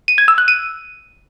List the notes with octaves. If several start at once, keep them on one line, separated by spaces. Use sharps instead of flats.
D#7
G#6
E6
F#6
D#7